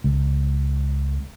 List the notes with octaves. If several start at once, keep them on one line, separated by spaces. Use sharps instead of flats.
C#2